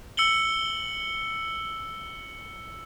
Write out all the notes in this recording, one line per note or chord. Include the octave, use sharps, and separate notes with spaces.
E6 C#7 F#7 G7